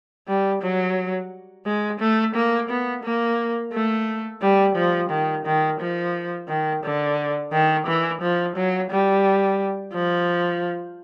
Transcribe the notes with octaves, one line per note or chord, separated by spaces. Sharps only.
G3
F#3
G#3
A3
A#3
B3
A#3
A3
G3
F3
D#3
D#3
F3
D#3
D3
D#3
E3
F3
F#3
G3
F3